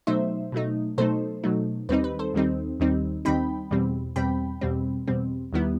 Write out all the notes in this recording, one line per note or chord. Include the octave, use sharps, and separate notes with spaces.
B2 F#3 A3 D#4 C5 E5
B2 F#3 A3 D#4
B2 F#3 A3 D#4 A4 C5
B2 F#3 A3 D#4
D#2 D#3 G3 C4 D#4 B4
B4
A4 C5
D#2 D#3 G3 C4 D#4
D#2 D#3 G3 C4 D#4
D#2 D#3 G3 C4 D#4 G5 B5
E2 B2 G3 C4
E2 B2 G3 C4 G5 B5
E2 B2 G3 C4
E2 B2 G3 C4
D#2 D#3 G3 B3 E4